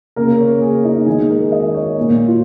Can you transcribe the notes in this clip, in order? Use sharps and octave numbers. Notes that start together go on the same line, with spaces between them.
C#3 A#3 A#4
C#5
G#4
D#4
D#3 G#3 G#4
A#4
D#5
C#5
A#2 A#3
F4